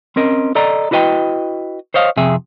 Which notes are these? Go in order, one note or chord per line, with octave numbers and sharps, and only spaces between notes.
C4 C#4 A#4 D#5
A4 D5 D#5 A#5
E4 F#4 B4 D#5 F#5 G5
C5 C#5 D#5 F5
F2 C3 G#4 E5